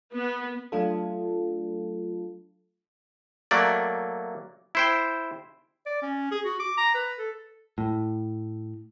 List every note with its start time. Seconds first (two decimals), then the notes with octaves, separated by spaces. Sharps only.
0.13 B3
0.72 F#3 A3 D4 F4 A4
3.51 F#3 A3 A#3 D5
4.75 E4 C5 G5
5.86 D5
6.02 C#4
6.31 G#4
6.45 F#4
6.60 D6
6.77 A#5
6.95 B4
7.19 A4
7.78 A2